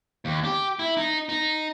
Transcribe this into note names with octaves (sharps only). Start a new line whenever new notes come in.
D#2
G4
E4
D#4
D#4